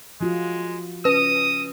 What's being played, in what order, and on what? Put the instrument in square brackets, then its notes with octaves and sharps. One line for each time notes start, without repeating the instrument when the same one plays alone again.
[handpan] F3 F4 F#4 [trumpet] G#3
[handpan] C#4 [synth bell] B4 [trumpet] D#6